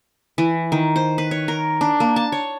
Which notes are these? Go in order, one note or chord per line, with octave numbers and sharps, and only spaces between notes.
E3
D#3
C5
B4
C#5
A#4
D4
A#3
A5
C#5